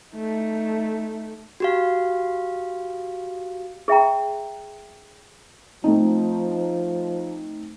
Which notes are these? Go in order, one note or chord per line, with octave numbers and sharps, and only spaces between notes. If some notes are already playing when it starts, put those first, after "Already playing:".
A3 D#4
F#4 G4 F5
G#4 E5 G5 A#5
F3 A3 C4 D#4